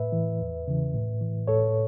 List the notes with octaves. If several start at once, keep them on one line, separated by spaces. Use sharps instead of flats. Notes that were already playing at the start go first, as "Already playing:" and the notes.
Already playing: A2 B4 E5
E3
E2
C#3 E3
A2
E3
A2 A4 C#5